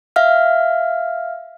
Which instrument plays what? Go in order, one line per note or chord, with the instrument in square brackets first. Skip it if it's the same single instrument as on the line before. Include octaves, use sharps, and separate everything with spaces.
[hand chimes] E5 F5 F6